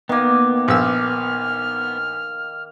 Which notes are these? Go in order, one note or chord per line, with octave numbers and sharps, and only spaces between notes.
D#3 A#3 B3 D#5
A#1 E6 F6